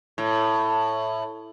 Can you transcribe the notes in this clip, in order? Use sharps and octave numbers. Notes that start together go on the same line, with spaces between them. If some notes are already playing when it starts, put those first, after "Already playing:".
A2